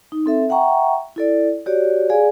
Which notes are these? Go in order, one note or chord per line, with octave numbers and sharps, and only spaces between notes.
D#4
C4 A4 E5
E5 F#5 G5 A#5 C#6
E4 A4 D5
F#4 G4 C#5 D5
G#4 D5 F5 G#5